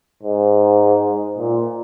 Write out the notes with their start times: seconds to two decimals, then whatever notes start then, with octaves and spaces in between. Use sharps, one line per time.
0.23 G#2
1.38 A#2